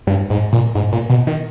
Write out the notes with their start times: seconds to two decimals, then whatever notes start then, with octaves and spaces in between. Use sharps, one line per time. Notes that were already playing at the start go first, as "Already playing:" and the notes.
0.07 G2
0.30 G#2
0.53 A#2
0.75 G#2
0.92 A#2
1.10 B2
1.27 D#3